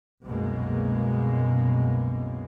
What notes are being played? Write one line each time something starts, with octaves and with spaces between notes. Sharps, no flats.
C2 F#2 B2 G#3 A#3